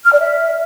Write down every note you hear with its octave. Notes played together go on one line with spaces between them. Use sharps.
F6
D5
E5